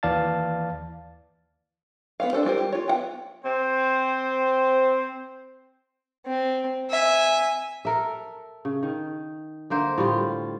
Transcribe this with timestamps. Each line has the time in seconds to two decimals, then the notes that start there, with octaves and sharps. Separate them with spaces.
0.03 D#2 E3 D5 F5 A5 A6
2.20 B3 C5 F5
2.33 D4 A4 C5
2.45 G3 F4 A#4 C5
2.58 G4
2.72 F4 C#5
2.88 B3 F#5 G5
3.44 C4 C5
6.26 C4
6.90 E5 G#5
7.85 A4 A#4 E5
8.65 C#3
8.83 D#3
9.70 D3 A#3 C5 E5
9.98 A2 G3 F4